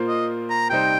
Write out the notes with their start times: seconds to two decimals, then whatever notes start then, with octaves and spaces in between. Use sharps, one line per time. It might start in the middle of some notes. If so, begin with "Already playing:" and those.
Already playing: A#2 A#3 F4 C5
0.08 D#5
0.50 A#5
0.70 C3 G3 D#4 C5 G5